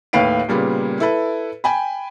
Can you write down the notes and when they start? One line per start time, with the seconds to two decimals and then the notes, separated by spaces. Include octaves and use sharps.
0.13 D#2 A2 B4 F5 C7 D7
0.49 A#2 C#3 G3 A#3 B3
1.00 E4 A4 B4
1.64 G5 G#5 B5